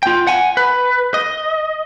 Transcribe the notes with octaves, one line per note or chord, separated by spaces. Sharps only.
F4 G5
F#5 G#5
B4
D#5